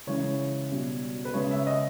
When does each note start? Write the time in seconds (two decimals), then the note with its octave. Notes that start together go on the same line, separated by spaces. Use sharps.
0.07 C#3 E3 G#3 C#5
0.71 B2 G3
1.25 B4
1.34 C#3 G#3 C#5
1.51 E5
1.67 D#5